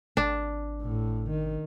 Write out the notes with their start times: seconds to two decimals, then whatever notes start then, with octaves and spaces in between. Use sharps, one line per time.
0.17 G#1 D4
0.82 A2
1.30 D#3